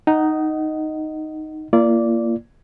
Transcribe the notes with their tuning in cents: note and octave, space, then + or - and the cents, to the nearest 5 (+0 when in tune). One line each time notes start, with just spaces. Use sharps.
D#4 +0 D#5 +0 F#5 +20
A#3 +0 F4 -40 D5 -10